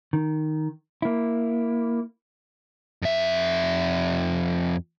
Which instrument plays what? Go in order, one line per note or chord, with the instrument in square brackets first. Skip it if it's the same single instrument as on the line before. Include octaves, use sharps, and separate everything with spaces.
[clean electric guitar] D#3
A#3 E4
[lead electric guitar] F2 E5